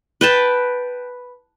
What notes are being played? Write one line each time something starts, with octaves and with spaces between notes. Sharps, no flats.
B4 G5 A5